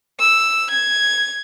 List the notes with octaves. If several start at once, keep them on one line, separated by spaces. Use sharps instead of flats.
E6
G#6